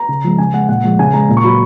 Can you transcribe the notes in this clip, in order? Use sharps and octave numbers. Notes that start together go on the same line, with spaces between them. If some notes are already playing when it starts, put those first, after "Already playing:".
Already playing: A#5
C#3
F3 G#3
C#3 G#5
G#3 F#5
A#2 F#5
F3 G#3
C#3 G#5
G#3 A#5
A#2
C#6
F#3 B5